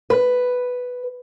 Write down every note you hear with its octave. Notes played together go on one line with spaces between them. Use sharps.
B4